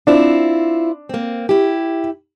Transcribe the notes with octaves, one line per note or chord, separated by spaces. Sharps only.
C4 D4 E4 F4
A#3 C4
E4 G4